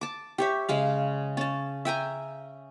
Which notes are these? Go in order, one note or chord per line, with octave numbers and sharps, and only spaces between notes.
A5 D6
G4 C#5 E5
C#3 G#3 F5
C#4 A5
E5 G5 G#5 A#5